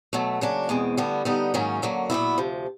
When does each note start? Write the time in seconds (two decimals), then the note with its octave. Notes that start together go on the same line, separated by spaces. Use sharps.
0.13 B2 F#3 A3
0.41 C#3 F#3 A#3 D4
0.69 E2 B2 G#3 C4
0.97 D2 D3 G3 B3
1.25 D3 G3 B3 D#4
1.54 G#2 D#3 F#3 A#3 C#4
1.82 F#2 D3 F#3 A#3
2.10 A#2 F#3 B3 E4
2.38 D2 C3 F3